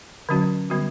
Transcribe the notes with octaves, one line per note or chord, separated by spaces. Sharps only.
D3 F#3 C#4 F#4
D3 G3 B3 F#4